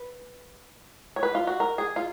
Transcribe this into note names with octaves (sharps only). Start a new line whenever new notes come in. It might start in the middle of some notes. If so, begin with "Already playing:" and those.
Already playing: B4
C#5
B4
F4
F#4
A#4
G#4
F4